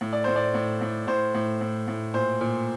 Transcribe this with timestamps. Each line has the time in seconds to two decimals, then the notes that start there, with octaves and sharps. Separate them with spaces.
0.01 A2
0.13 D5
0.24 A2 C5
0.36 D5
0.54 A2
0.81 A2
1.07 A2 C5
1.35 A2
1.61 A2
1.88 A2
2.14 A#2 C5
2.41 A#2